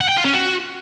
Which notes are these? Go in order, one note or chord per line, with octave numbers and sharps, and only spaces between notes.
F#5
G5
F4
C#4
F#4